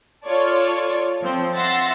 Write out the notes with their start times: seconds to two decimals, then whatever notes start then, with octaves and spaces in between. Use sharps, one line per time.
0.25 F4 A4 C#5 D5
1.22 F3 C4
1.56 E5 F#5 C6 E6 A6 A#6